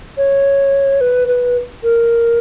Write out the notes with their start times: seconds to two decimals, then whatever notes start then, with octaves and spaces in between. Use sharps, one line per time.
0.17 C#5
1.01 B4
1.28 B4
1.83 A#4